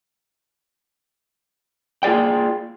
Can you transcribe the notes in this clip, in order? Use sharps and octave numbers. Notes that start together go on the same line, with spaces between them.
A#3 F4 G#4 D5 G5